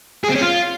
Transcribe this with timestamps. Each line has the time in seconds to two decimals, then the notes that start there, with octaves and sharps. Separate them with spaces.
0.24 G#4
0.30 C4
0.35 C#4
0.41 F4